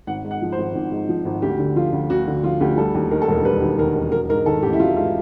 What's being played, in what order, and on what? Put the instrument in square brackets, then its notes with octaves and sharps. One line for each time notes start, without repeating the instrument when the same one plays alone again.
[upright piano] G#1 F#5
G#2
F#5
F3
C5
G#1
G#1
G#2
F3
G#1
D2 G4
D3
F3 F4
D2
D2 F#4
D3
F3 F4
D2 G4
G3 A4
D#2
D#3 A#4
A4
E1 A#4
G3 B4
D#2
D#3 A#4
E1
F#3 A#4
G#2 A#4
D#3 A4
A1 G4
E4
F#3 F4
G#2 F4